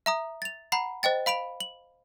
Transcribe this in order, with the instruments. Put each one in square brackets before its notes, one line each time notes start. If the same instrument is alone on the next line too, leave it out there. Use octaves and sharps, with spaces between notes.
[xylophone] E5 A#5 D#6
A6 F7
F#5 A#5 B5 C7
C5 D#5 G5 A6
F5 B5 D7 F7
F#7